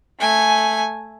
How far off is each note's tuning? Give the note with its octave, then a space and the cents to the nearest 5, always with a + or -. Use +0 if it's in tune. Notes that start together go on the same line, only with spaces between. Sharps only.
A3 +0 G#5 +0